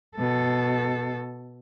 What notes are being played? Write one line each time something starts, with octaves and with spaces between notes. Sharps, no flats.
B2 A4